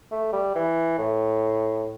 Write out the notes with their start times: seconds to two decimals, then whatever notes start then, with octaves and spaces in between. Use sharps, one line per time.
0.12 A3
0.33 G3
0.55 E3
0.98 A2